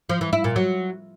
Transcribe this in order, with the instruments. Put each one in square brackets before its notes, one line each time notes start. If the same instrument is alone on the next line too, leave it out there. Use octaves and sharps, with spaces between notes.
[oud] F3
E3
E4
A#2
F#3